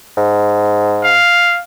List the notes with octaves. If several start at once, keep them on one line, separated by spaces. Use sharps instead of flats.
G#2
F5